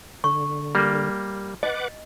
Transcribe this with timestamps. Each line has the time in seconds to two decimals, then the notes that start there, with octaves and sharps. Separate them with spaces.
0.24 D3 C#6
0.75 G3 A#3
1.63 B4 D#5 F#5 D6